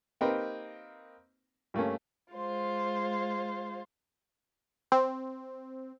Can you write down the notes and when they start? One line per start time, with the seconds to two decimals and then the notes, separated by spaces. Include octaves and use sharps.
0.21 A#3 C4 D#4 G4 A#4 B4
1.74 G2 A3 A#3 C#4
2.33 G#3 F4 C5
4.92 C4